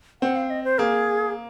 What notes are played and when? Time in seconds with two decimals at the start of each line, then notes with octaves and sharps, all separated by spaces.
0.22 C4 F#5
0.36 F5
0.50 D#5
0.64 C5
0.79 A#3 G#4